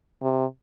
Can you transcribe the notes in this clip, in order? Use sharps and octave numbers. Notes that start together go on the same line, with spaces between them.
C3